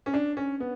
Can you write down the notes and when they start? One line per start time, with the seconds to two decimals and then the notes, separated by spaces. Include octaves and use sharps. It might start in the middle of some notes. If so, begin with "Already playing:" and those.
0.06 C#4
0.14 D4
0.37 C#4
0.60 B3